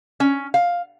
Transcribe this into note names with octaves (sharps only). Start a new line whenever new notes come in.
C#4
F5